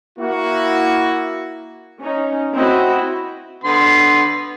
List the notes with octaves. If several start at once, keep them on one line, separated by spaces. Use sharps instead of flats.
A#3 E4 F#4
C#4 D#4
C4 E4 F#4 D#5
D3 B3 C6